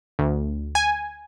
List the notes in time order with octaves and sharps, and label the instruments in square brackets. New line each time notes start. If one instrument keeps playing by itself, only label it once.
[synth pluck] D2
G#5